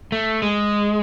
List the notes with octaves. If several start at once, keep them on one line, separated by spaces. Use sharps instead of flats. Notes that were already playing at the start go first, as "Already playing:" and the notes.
A3
G#3